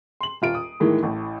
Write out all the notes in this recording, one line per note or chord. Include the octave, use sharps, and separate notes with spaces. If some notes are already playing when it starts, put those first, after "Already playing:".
C6 F#7
D#1 F4 D7
D#6
A2 D#3 E3 G#3 A#3
A1 A2